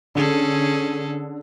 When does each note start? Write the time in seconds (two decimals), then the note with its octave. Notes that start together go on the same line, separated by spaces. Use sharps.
0.15 D3 C#4 G#4 A4